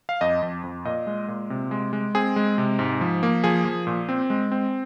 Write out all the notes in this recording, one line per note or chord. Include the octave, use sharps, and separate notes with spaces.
F5
F2 D#5
F2
F2
A#2 D#5
G#3
A#2
C3
G#3
G#3
C4 G#4
G#3
C3
G#2
F3
A#3
F3 G#4
F3
A#2
C4
G#3
C4